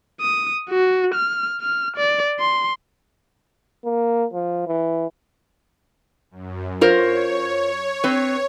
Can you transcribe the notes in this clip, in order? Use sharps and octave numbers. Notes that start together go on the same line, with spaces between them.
D#6
F#4
F6
F6
D5
C6
A#3
F3
E3
F#2
F4 A#4 C5 C#5
C4 B4